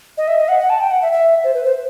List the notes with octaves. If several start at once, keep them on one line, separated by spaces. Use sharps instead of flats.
D#5
E5
D#5
F#5
F#5
A5
G5
F#5
E5
E5
C5
B4
C5